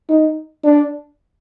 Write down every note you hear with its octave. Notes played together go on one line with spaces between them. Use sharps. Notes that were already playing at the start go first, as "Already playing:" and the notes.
D#4
D4